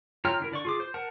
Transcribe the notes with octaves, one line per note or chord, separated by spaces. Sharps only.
F4 C#5 G5 A#5 F6
D3 E4 A#4
D3 D5 C#6
F4 G#4 D6
C5
A#4 F#5 A5